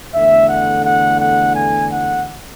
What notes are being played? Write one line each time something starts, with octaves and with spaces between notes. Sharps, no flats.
E2 D3 A3 E5
F#5
F#5
F#5
G#5
F#5